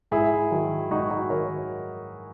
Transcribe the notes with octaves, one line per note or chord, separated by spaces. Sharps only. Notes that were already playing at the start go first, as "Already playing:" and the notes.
G#2 E4 G#4
D#3 F#3
G#2 D#4 F#4
D#4 F#4
D#3 F#3 A#4 C#5